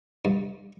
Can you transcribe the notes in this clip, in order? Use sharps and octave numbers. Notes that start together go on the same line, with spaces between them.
G2